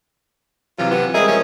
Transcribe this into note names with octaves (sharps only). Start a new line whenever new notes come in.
C3 E3 F#3 F4
B3 F4
G3 G#3 C4 G#4 A#4 D#5 E5
F3 C#4